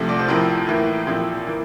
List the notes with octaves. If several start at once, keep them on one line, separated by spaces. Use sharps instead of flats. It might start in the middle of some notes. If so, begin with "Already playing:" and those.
Already playing: C2 C3 F3 A3
D5
C5
A2 F3 C4 E4 A#4
A2 E3 A#3 E4
A#2 F3 C4 E4
E3 A#3